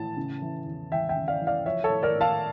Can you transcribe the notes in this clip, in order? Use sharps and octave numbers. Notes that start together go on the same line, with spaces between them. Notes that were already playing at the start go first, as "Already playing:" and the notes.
Already playing: A2 E3 A5
C#3
E3
E2
E2 E5 G5
E5 G5
C#3
D5 F5
E3
D5 F5
F3 C#5 E5
A4 C#5
A2
A#4 D5
A2
F5 A5